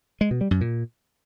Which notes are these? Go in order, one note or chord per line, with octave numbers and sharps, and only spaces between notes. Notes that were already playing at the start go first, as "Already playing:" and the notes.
G#3
B2
G3
F#2
A#2